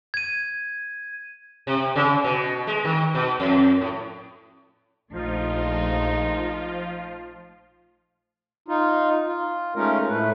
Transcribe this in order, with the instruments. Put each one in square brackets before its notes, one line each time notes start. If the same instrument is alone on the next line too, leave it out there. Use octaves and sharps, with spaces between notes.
[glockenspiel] G#6 D#7
[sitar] C3
C#3
B2
G#3
D#3
B2
F2
A2
[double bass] A#1 [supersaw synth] F3 F4 [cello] A3 D#4
[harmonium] D#4 F4
F4
G#3 A3 C#4 D#4 F4 A#4
A2 A3 B4